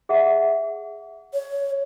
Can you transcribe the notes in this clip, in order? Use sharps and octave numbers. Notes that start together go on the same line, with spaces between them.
G#4 E5 F#5
C#5